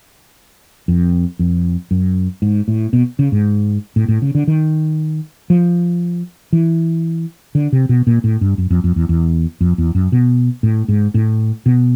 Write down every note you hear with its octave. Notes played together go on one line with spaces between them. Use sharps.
F2
F2
F#2
G#2
A2
B2
C#3
G#2
A2
A2
C#3
D3
D#3
F3
E3
D3
C3
B2
A#2
A2
G2
F#2
F2
F2
E2
E2
F2
E2
F#2
B2
A2
G#2
A2
B2